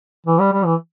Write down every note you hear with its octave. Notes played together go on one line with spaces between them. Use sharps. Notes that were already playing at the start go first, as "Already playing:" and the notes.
E3
G3
G3
E3